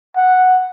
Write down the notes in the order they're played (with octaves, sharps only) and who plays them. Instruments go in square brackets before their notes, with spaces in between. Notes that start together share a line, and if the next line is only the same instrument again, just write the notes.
[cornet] F#5